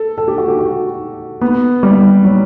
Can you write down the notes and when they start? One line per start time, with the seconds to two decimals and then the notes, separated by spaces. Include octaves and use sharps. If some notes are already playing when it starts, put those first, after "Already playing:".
Already playing: A4
0.18 A4
0.28 G4
0.38 F#4
0.48 G4
0.59 F#4
1.41 B3
1.83 G3
2.24 F#3